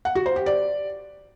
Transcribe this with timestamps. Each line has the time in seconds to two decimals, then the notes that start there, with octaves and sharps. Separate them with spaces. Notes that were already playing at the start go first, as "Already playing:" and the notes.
0.05 F#5
0.15 F#4
0.26 C5
0.36 G4
0.46 D5